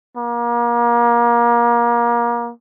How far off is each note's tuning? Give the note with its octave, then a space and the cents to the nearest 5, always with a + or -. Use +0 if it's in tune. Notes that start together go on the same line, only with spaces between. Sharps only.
A#3 +30